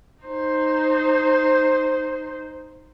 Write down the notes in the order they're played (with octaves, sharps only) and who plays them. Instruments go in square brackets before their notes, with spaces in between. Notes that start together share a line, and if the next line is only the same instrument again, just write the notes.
[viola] D#4 C5